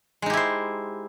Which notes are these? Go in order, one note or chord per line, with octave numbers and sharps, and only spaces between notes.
G#3 D#4 E4 G4 C5